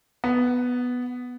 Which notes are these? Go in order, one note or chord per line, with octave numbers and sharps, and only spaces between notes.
B3